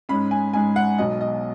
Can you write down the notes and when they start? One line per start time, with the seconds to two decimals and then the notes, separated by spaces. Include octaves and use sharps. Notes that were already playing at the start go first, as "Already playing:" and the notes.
0.09 G#2 G#3 C#4 B5
0.31 G#5
0.53 G#2 G#3 C#4 G#5
0.76 F#5
0.98 B1 B2 F#3 D#5
1.21 D#5